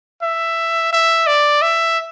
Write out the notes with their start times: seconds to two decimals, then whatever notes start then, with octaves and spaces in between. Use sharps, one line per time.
0.23 E5
0.93 E5
1.27 D5
1.62 E5